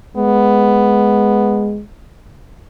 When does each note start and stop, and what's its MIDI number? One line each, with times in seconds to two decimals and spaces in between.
0.17 1.81 56
0.17 1.79 59